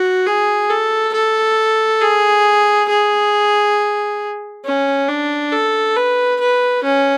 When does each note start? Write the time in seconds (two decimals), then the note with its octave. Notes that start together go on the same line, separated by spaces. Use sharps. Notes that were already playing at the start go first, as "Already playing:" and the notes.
Already playing: F#4
0.26 G#4
0.70 A4
1.14 A4
2.01 G#4
2.89 G#4
4.65 C#4
5.08 D4
5.52 A4
5.96 B4
6.40 B4
6.84 C#4